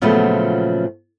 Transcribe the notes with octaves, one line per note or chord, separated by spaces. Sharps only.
A#2 C#3 F3 F#3 A3 B3